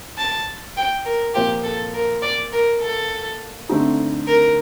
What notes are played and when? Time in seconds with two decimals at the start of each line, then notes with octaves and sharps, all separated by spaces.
0.18 A5
0.77 G5
1.05 A#4
1.34 A#2 F3 A#3 F4 G4 C5
1.64 A4
1.94 A#4
2.22 D5
2.53 A#4
2.81 A4
3.69 D3 A3 C4 D#4
4.27 A#4